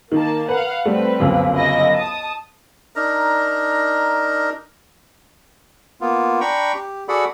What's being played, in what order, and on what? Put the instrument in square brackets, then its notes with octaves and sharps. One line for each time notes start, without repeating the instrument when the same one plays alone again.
[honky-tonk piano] D#3 [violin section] A#3 A5
[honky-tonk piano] B4 [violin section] F5 F#5
[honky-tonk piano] G3 A3 [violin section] C4 B4
[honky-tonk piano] G1 C#2 F#2
[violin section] E4 D#5 A#6
A5 D#6
[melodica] D4 D#4 A#4 A#5
[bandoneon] A#3 B3 F4
D4 G5 A#5 B5 C#6
G4
F#4 G#4 A4 D5 F#5 B5